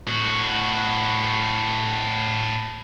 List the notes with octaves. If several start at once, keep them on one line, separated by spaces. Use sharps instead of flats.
A2 F#4